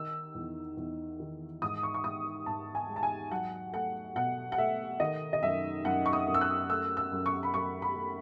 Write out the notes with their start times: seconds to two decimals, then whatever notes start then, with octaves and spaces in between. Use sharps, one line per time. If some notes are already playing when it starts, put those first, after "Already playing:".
Already playing: D#3 E6
0.35 E2
0.77 E2
1.20 D#3
1.62 G#2 D#6
1.83 C#6
1.94 C#6
2.04 G#2 D#6
2.46 G#2 A5
2.75 G#5
2.89 G#3
2.96 A5
3.03 G#5
3.31 F#3 F#5
3.73 A3 F#5
4.16 B2 F#5
4.52 F#5
4.58 A3 E5
5.00 D#3 D#5
5.33 D#5
5.42 F#2 E5
5.85 F#2 F#5
6.06 C#6
6.13 D#6
6.27 F#2
6.34 E6
6.41 F#6
6.69 A3 E6
6.97 E6
7.12 F#2
7.26 C#6
7.43 B5
7.54 F#2 C#6
7.82 B5
7.96 A3